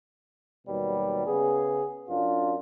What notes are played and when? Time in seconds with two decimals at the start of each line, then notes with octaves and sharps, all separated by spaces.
0.66 D#2 B2 F#3 G3
1.27 C#3 B3 G#4
2.08 F#2 D4 F4